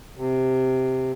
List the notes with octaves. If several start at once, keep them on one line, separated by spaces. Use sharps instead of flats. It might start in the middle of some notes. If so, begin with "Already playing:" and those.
C3